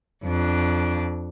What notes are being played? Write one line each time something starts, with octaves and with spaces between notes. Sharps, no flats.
F2 D4